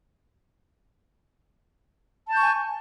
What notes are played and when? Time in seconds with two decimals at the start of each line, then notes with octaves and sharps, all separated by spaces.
2.27 A5
2.32 G6
2.36 C#6
2.40 G#5